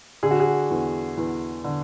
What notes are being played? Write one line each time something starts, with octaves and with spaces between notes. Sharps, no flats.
D3 G#4
F#4
G#4
E2
E2
D3